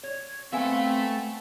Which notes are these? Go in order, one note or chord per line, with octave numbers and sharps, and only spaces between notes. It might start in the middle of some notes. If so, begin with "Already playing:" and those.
C#5
A3 B3 C4 A4 E5 F5 G#5